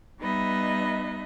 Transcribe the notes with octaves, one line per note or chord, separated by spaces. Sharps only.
G3 B3 D#4 B4 D#5 E5